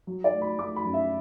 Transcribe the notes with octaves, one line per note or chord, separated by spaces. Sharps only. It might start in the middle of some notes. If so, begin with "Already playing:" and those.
F#3
D5
A3
B5
A3 D6
B5
F#2
E5